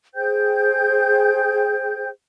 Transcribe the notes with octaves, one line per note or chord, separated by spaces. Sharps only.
G#4 C5 G5 G6